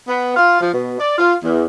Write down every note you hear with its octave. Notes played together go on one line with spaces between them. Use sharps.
B3
F4
F3
B2
D5
F4
E2